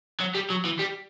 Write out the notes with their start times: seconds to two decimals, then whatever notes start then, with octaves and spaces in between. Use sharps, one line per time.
0.20 F#3
0.35 G3
0.50 F#3
0.65 E3
0.79 G3